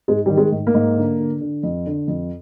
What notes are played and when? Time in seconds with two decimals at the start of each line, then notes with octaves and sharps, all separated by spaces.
0.08 G#2 G#3
0.26 D#3 G3
0.37 G#3
0.52 G#2
0.67 A#3
0.74 G#2
0.97 D3
1.19 D3
1.41 D3
1.63 F2
1.86 D3
2.08 F2